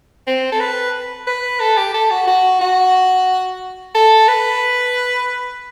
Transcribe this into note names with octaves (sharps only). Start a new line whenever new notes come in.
C4
A4
B4
B4
A4
G4
A4
F#4
F#4
F#4
A4
B4